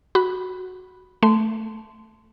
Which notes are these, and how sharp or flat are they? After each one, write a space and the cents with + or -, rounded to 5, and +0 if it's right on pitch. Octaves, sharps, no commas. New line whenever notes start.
F#4 +0 B5 +0
A3 +0 C6 -15